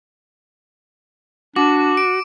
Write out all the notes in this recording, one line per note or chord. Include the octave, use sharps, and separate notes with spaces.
D4 F#4 D6
D7